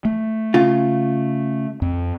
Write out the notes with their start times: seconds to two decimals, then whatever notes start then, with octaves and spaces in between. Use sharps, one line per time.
0.05 A3
0.54 C#3 F4
1.82 F2